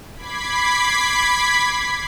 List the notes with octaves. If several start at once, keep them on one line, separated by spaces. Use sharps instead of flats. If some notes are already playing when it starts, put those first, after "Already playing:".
B5 D6 G#6 B6 C7